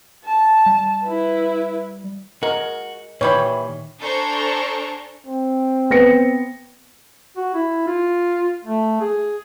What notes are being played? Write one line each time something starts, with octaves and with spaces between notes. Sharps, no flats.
A5
G3
E4 B4
G#3 F#4 A#4
A#2 D#3 E3 G3 C#5 B5
D4 A4 C5 G#5 A#5 C#6
C4
B3 A#6 C#7
F#4
E4
F4
A3
G#4